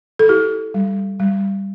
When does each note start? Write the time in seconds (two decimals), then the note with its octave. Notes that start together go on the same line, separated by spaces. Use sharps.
0.19 A4
0.29 E4 G4
0.74 G3
1.19 G3